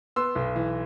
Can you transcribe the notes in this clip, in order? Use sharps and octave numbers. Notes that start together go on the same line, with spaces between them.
B3 C6 E6
B1
E3